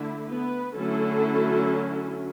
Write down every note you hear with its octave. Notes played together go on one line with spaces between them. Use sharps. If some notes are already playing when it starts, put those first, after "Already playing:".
Already playing: D3 A3 E4
B3 B4
D3 F#3 A3 C#4 E4 A4